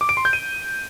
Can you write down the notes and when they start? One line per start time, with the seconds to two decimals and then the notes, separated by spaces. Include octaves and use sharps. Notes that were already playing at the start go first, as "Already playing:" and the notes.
0.01 D6
0.09 D7
0.17 C6
0.25 G6
0.33 D#7